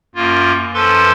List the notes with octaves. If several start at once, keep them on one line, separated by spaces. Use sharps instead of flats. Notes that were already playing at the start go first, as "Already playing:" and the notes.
F#2 A#3 F4
F#2 F3 A4 B4 C6